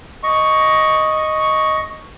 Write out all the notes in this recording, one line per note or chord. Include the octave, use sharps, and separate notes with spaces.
D#5 C#6